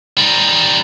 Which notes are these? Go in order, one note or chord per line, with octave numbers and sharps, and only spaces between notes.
G3 D#4